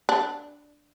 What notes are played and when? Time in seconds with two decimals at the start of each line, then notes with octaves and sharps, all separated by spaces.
0.09 D4